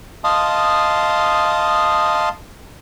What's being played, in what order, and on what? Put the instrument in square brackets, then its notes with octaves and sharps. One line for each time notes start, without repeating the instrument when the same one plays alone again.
[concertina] D#5 F5 A5 C6 D#6